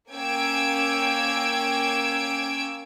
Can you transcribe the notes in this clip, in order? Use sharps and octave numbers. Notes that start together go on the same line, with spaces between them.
A#3 C#4 G5 E6 G#6 D7